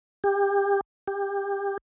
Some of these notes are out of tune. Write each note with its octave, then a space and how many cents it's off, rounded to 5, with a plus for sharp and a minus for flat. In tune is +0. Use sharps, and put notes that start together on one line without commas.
G4 +30
G4 +25